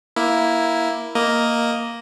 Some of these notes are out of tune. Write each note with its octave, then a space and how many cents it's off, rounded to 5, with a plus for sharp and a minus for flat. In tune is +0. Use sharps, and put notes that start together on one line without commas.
A#3 +10 E4 +0
A#3 +0 D#5 +0